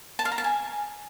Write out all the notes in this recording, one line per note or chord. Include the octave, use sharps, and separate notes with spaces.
A5
F5
A#5
A5
G#5